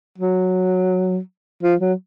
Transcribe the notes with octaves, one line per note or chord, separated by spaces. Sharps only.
F#3
F3
F#3